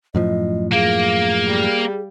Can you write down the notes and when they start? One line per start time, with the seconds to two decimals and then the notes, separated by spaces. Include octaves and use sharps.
0.15 F#2 A2 F3 D#5
0.72 A#3 G#4 F5
1.46 G3